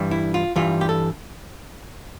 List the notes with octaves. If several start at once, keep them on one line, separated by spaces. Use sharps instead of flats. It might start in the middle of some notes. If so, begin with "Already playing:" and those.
Already playing: G2 E3 G3
E4
F4
G2 E3 G3 F4
G4
A4